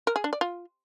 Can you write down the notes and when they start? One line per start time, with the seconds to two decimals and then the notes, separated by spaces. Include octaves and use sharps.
0.07 A#4
0.16 G#4
0.24 D4
0.33 D5
0.41 F4